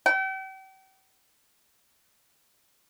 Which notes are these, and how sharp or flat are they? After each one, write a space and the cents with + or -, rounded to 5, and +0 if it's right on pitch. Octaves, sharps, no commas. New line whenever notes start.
G5 -40